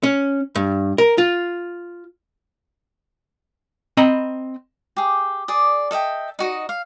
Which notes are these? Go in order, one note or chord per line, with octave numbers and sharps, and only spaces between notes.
C#4
G2
A#4
F4
C4 D#5 A#5 B5
G4 G#4
G#4 D5 D#6
A4 D#5 E5 G5
D#4 F#4 D#5
F5